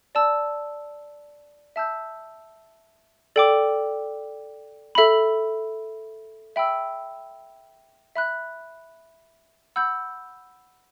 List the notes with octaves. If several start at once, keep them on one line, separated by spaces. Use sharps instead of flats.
D5 A5 E6
E5 A5 E6 G6
A4 D5 G5 D6
A4 E5 B5
E5 G5 B5 E6
E5 B5 F#6
F#5 B5 E6 G6